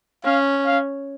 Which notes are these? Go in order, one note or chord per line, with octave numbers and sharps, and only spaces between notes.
C#4 F5
F5